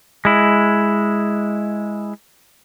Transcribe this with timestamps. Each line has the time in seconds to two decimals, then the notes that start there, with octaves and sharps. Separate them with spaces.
0.25 G#3 E4